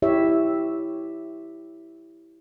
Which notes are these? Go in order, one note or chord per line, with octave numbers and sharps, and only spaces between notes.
E4 G4 C#5 E5